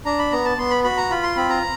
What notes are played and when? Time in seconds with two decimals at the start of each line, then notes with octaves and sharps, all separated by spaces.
0.05 D4 A#5
0.19 B5
0.32 B3 A#5
0.45 A5
0.57 B3 C6
0.71 B5
0.84 F#4 B5
0.97 A#5
1.10 F4 B5
1.23 C6
1.36 C4 B5
1.50 A#5